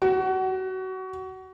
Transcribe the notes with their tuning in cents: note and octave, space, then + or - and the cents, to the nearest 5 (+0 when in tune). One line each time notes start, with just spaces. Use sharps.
F#4 +25